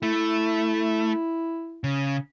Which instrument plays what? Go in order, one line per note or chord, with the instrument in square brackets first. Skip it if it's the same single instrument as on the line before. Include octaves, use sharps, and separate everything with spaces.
[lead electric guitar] A3 [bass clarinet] E4
[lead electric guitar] C#3